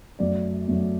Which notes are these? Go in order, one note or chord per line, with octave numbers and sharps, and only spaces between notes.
F#2 F#3 A3 D5
F#2 F#3 A3